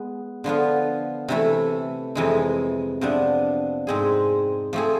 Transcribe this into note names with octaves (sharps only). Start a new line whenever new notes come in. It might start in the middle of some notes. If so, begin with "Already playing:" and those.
Already playing: G#3 B3 G#4
D3 F3 B3 F4
C3 E3 A3 E4
F2 C3 E3 G#3
C3 F3 B3 D4
G#2 G#3 C4 G#4
F3 A3 C4 G#4